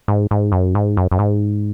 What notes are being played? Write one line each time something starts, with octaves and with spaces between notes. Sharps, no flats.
G#2
G#2
F#2
G#2
F#2
F#2
G#2